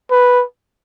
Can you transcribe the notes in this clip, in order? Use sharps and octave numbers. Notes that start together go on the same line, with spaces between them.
B4